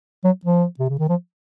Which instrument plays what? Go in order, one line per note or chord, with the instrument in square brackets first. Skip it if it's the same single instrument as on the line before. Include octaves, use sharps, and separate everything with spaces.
[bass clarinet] F#3
F3
C3
C#3
D#3
F3